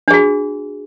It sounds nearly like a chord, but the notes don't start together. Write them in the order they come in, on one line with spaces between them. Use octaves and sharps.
D4 G#4 F#4